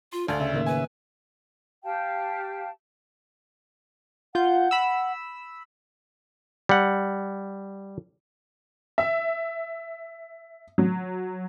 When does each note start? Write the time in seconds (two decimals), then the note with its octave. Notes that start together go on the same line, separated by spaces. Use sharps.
0.13 F4 C6
0.28 D2 D5 F5 G#5 A5
0.40 C#3 E5
0.53 A2 D#3 A#3
0.66 B4 G#5
1.84 G4 F5 G5 A5
4.35 F4 F#5 G6
4.71 B5 E6
6.69 G3 F#5
8.98 E5
10.78 F#3